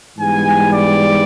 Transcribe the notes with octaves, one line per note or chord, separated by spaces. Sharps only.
G#2 E3 G3 B3 G#5
D5